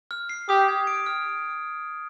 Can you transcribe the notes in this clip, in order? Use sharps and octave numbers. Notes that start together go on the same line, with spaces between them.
F6
C7
G4 D#6
G#6
D7
F6